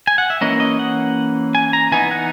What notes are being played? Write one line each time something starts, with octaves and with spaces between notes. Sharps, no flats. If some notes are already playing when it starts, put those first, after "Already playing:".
G#5
F#5
E5
E3 A#3 C#4 D#5
D#5
F#5
G#5
A#5
E3 B3 D#4 G#5
F#5